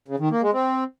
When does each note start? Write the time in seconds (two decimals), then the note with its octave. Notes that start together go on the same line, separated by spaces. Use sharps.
0.08 C#3
0.19 D#3
0.31 A#3
0.42 G#3
0.53 C4